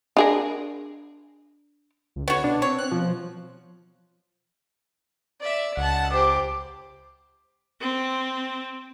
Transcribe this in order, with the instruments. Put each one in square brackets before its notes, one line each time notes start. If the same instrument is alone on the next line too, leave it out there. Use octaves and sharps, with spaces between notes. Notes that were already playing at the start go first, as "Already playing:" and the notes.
[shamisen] D4 G#4 A#4
[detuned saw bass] C#2
[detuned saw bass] D3 [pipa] B3 F#4 [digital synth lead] C#5
[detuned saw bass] B2 [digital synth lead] D4
[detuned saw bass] C4 [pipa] C#5
[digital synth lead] F#6
[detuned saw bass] B2 [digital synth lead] F3
[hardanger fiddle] D5 E5
[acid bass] C#2 [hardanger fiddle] F#5 A5
[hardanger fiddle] G4 C5 [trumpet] D6
[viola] C4